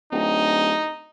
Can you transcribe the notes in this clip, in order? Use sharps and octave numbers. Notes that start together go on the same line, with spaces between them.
D1 D#4